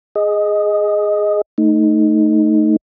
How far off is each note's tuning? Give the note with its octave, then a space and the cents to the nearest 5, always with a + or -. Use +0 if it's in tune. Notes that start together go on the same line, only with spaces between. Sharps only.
G#4 +0 D#5 +0
A3 +0 D#4 +0